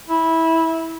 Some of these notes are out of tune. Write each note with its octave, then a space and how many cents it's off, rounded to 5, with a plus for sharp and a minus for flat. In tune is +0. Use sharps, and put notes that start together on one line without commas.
E4 -15